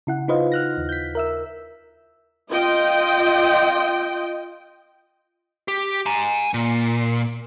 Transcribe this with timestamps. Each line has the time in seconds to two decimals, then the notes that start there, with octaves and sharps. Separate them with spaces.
0.07 C#3 E4 F#5
0.28 D#4 F4 B4 C5 D#5 F5
0.52 F6 F#6 A#6
0.77 D#2
0.89 G6 B6
1.15 A#4 E5 E6
2.50 F4 D#5 G5
5.68 G4
6.06 G#5 A#5
6.54 A#2